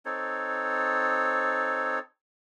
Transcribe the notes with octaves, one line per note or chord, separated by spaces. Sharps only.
C4 D#4 A4 C#5